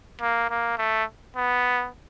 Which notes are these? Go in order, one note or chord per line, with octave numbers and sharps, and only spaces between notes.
A#3
A#3
A3
B3